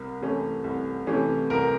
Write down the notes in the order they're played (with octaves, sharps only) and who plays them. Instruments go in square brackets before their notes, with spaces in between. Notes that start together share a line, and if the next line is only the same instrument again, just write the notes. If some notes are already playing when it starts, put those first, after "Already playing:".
Already playing: [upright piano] C2 [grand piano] A#4
[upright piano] C3 E3 A3 C#4
C2
C3 E3 A3 C#4
[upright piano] C2 [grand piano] A#4